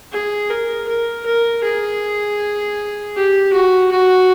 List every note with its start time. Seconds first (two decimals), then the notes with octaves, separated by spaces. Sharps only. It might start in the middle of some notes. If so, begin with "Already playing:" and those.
0.12 G#4
0.50 A#4
0.88 A#4
1.26 A#4
1.63 G#4
3.15 G4
3.53 F#4
3.91 F#4